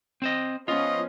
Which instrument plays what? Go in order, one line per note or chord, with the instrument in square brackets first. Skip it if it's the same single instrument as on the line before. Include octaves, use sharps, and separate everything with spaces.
[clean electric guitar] C4 C5 D#5
[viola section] F3 B3 C#4 [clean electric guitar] F4 [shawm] D#5